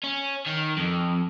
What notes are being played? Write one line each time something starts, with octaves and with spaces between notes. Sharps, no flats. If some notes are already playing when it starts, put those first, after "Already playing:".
C#4
D#3
F2